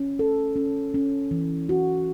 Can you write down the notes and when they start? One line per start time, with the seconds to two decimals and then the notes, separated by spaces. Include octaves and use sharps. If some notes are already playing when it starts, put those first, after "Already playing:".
Already playing: C#4
0.19 A4
0.56 C#4
0.94 C#4
1.31 E3
1.69 F#4